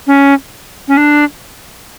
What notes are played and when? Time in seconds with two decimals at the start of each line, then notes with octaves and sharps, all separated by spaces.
0.07 C#4
0.88 C#4
0.97 D4